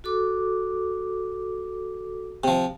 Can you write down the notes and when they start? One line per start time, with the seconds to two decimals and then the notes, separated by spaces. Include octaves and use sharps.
0.04 F#4 A4 D6
2.44 C3 F3